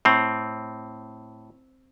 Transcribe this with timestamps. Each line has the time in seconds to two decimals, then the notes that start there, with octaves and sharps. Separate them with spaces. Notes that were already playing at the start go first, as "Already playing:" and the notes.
0.05 A2 C4